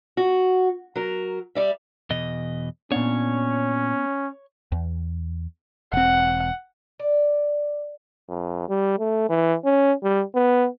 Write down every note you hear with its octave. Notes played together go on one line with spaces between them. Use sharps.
F#4
F#3 A#4
G3 D5 E5
E2 B2 D#5
A#2 B3 C#4 D4 C#5
E2
E1 C4 F#5
D5
F2
G3
A3
E3
C#4
G3
B3